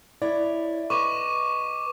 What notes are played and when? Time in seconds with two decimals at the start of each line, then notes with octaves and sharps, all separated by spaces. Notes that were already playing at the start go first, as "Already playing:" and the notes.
0.22 E4 C#5 D5
0.90 B4 D#5 C#6 D6 D#7